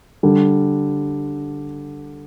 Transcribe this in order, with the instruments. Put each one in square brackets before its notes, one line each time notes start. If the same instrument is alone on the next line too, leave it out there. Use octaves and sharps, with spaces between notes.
[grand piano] D3 G3